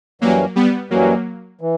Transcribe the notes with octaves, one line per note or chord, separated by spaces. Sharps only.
F#2 E3 F#3 G3 A#3 C#4
G3 B3
F#2 E3 F#3 G3 A#3 C#4
E3